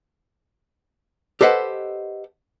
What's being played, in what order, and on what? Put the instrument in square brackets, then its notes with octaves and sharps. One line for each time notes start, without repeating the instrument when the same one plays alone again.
[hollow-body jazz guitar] G4 A4 B4 C5 D#5 F#5